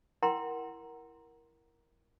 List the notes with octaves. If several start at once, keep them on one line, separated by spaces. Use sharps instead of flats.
E4 A#4 F#5 G5 A#5 C6